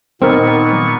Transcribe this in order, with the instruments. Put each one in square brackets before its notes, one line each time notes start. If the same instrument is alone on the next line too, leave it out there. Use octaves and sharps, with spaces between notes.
[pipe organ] A#2 B3 C#6 [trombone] D#3 [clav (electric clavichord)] C4 A#4